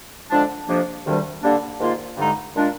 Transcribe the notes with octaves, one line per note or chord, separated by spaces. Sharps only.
D3 F3 G#3 D4
F2 C3 F3 A#3 D4
D2 C3 D#3 G3 D4
D3 G3 A#3 D4
G#2 D#3 A#3 F4
G2 D3 G#3 D#4
A#2 G#3 D4 F4